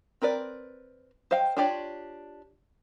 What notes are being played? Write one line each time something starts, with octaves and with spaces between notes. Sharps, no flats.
C4 A#4 B4 D5
C5 D#5 F5 G5
D4 F4 G4 C#5 D5